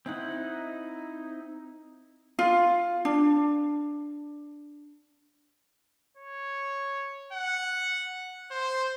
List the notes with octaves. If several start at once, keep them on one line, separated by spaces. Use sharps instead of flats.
C4 D#4 E4 F#5
F4
D4
C#5
F#5
C5